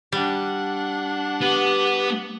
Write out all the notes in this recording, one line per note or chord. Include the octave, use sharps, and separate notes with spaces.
G3 D4 F#5
B3 G4